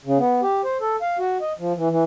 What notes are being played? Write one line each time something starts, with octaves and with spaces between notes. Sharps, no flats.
C#3
B3
G4
C5
A4
F5
F#4
D#5
F3
E3
E3